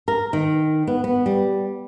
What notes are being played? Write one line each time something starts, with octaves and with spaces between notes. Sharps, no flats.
A#4
D#3
B3
B3
G3